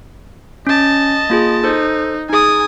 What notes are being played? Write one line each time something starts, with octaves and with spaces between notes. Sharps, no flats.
C#4 D#5 A5
A#3 F4 G#4
D#4 A4 C5
D#4 G#4 G#5 D#6